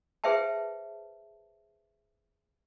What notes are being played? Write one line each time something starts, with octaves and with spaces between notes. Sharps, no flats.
G#4 B4 C5 E5 G5 A5